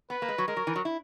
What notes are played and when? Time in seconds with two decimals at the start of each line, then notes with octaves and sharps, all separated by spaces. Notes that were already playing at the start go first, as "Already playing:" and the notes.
0.10 B3 B4
0.22 A#3
0.28 G#3
0.38 F#3
0.48 G#3 A#4
0.57 F#3
0.67 E3
0.76 F#3
0.85 E4